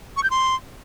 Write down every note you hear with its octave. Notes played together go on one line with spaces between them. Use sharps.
C#6
G6
C6